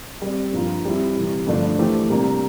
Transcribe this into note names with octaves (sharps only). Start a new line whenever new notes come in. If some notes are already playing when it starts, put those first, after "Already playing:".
G3 C4 G4 D5
G2 F3 A#3 F4 A#4
G3 C4 E4
C3 E3 G3
G2 D3 F3 A3 D4
E3 A3 E4 G4 C5
C3 G3 A#3 D4